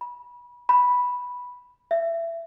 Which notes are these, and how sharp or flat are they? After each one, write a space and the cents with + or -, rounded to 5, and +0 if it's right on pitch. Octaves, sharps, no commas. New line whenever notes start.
B5 -25
B5 -5
E5 +20